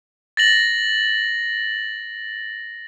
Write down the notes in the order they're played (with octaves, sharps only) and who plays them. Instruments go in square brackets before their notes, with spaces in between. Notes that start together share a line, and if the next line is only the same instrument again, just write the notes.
[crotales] A6 A#6 F#7